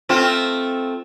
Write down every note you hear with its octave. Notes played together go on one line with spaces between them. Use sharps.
A3 C4 F4